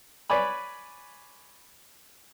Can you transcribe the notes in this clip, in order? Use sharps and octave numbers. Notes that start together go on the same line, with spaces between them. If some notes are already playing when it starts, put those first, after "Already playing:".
B4 C#5 D5 G#5 B5